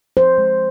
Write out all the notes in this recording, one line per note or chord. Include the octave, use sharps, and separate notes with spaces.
F3 C5
G#3